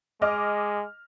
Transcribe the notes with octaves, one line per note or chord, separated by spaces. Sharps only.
G#3 D#5 D6 F6